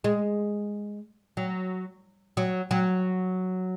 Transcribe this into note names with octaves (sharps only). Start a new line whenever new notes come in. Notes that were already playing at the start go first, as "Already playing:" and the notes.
G#3
F#3
F#3
F#3